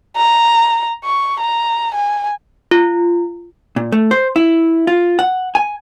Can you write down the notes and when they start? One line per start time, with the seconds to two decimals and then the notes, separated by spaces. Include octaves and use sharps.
0.17 A#5
1.04 C#6
1.40 A#5
1.95 G#5
2.71 F4
3.76 A#2
3.92 A3
4.11 C5
4.36 E4
4.87 F4
5.19 F#5
5.55 G#5